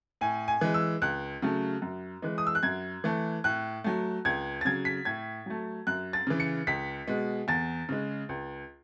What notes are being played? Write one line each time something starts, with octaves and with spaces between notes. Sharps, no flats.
A2 G#5
G#5
E3 G#3
E6
C#2 F#6
C#3 F#3 A3
F#2
E3 G#3
D#6
E6
F#6
F#2 G#6
E3 A3
A2 F#6
F#3 A3
C#2 G#6
A6
C#3 F#3 G#6
B6
A2 G#6
F#3 A3
F#2 F#6
A6
C#3 E3
C#7
C#2 B6
B2 G#3
E2 A6
C#3 G#3
C#2